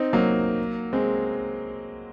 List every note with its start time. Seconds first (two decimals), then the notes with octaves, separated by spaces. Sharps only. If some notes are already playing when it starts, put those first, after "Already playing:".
Already playing: C4 D#4
0.13 F#3 A#3
0.93 G#3 C4